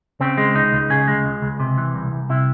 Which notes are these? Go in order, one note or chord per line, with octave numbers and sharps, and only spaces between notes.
C#3 C4
G#3
C#2 D#4
C#2
C#3 G#4
G#3
C#2
C#2
C3
E3
C2
C2
C3 E4